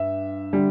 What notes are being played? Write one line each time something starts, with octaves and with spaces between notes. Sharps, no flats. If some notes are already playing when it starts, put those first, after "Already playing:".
Already playing: G2 E5
D3 G3